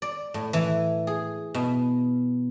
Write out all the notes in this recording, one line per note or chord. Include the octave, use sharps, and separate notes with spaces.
D5
A2
E3
G#4
B2